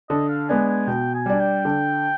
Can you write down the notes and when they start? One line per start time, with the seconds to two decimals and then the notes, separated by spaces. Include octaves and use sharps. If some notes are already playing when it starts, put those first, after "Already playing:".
0.10 D3 D#5
0.29 F5
0.49 G#3 B3 D4 G#5
0.68 G#5
0.87 B2 G5
1.14 G#5
1.26 G3 D4
1.39 G5
1.65 D3